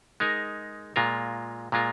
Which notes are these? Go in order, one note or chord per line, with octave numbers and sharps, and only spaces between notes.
G#3 D#4 A#4
A#2 G#3 F4 A#4
A#2 G#3 F4 A#4